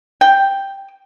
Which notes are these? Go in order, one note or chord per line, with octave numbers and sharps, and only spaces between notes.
G5